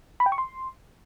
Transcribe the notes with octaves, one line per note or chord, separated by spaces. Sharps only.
B5
G5
C#6
C6